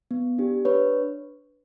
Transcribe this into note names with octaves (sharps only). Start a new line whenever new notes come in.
B3
D4 G4
D4 B4 C#5